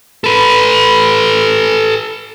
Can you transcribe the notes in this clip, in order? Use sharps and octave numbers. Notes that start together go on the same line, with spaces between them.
A4 B4